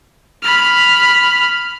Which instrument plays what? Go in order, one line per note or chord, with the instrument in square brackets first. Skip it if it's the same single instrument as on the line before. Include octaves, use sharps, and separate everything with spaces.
[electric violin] B5 F6